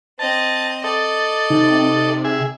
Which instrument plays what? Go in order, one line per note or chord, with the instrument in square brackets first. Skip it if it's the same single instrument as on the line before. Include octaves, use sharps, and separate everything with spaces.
[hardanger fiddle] C4 D#5 [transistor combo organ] A5
[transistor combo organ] A4 D#5 [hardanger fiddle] D5
[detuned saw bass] C3 [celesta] D#4
[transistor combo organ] G#4 E5